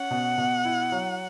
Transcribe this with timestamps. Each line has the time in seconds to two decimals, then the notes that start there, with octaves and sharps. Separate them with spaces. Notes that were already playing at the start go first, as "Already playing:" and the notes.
Already playing: C#4 F#5
0.11 B2
0.38 B2
0.65 E4
0.92 F#3